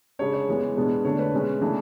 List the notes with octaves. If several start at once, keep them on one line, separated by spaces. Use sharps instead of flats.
C#3 G#3 D4 C#5
C#5
E3 G#3 B3
B2 G#3 B3 D4
D3 A3 D4 C#5
B4
B2 G#3 C#4
C#3 E3 A3 D4